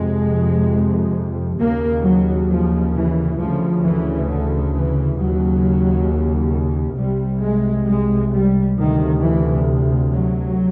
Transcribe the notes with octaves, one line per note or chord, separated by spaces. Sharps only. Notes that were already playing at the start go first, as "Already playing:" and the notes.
Already playing: F2 C3 G#3
D#2 C#3 A#3
F#3
F3
E3
D2 C#3 F3
E3
D3
E3
D#2 C#3 F#3
C2 C3 G3
G#3
G#3
G3
D2 C3 D#3
E3
F#3